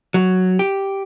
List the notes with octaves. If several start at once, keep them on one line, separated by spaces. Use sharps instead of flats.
F#3
G4